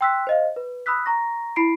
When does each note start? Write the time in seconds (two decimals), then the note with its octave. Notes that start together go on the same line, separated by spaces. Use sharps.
0.01 G5 C6 E6 F#6 B6
0.27 C5 D#5 F5
0.56 B4
0.86 B5 D#6 E6 F#6 B6
1.06 A#5 C#6 A#6
1.56 E4 B5 C7 D7